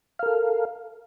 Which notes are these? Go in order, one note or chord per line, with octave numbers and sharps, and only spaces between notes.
A4 A#4 F5